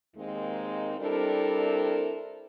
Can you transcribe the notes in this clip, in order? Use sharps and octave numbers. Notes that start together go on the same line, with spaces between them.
D#2 G#3 A#3 C4 D#4
G3 C4 D4 E4 A4 A#4